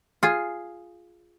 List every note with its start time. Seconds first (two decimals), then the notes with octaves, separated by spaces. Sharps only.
0.23 F4 G#4